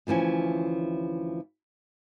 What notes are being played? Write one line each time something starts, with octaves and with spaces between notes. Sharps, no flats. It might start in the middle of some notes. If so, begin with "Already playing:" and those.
D2 E3 F3 C#4 G#5